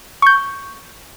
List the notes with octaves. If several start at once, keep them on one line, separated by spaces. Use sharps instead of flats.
C#6 G6